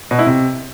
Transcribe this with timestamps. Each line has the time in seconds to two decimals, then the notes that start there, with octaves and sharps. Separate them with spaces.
0.11 B2
0.19 E4
0.26 C3